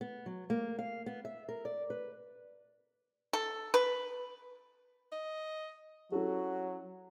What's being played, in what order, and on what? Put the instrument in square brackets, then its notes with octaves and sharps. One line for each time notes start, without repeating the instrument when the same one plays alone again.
[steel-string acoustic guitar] B3
F#3
A#3
F5
B3
E5
A#4
D5
B4
[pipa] A4
B4
[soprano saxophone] D#5
[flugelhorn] F#3 [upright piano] C#4 E4 A4 [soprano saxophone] F#4